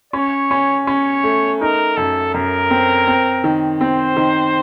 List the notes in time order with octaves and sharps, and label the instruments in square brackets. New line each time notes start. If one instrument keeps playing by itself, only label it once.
[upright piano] C#4 [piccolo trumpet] C#5
[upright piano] C#4
[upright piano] C#4 [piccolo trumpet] C#5
[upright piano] A3
[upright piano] D#4 [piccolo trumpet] A#4
[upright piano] F#2 [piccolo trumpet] A4
[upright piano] F#2 [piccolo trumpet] A#4
[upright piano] C4
C4
D#3
[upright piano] C4 [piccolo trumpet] C5
[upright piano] D#3